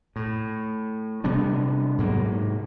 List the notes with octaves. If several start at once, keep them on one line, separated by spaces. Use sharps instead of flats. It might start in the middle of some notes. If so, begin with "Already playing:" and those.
A2
C3 G3 B3 D4
G#2 F#3 A#3